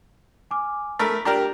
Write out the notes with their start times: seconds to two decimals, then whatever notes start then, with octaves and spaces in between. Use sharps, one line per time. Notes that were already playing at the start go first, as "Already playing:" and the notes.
0.51 G#5 D6 F6
0.99 A3 A#4 B5 B6
1.25 D4 G4 A#4 A#5